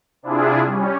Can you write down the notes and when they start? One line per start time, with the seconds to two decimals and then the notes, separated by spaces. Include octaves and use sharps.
0.23 C3 D4 E4 F4 G#4
0.65 G3 C#4